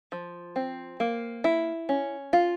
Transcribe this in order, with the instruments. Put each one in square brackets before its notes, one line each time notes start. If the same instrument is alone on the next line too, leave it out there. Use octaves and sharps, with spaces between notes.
[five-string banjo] F3
C4
A#3
E4
C#4
F4